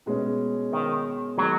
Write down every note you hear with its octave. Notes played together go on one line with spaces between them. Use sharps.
B2 G#3 C#4
D#3
D#3 F#3 G#3